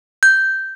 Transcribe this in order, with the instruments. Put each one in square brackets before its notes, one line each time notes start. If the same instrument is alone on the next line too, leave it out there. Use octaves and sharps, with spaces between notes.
[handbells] G6